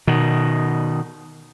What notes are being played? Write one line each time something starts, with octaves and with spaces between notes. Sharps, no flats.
B2 D#3